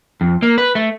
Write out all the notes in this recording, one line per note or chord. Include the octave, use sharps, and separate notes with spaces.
F2
A#3
B4
A3